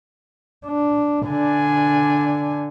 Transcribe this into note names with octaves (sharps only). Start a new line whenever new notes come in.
D4
D3 D4 G#5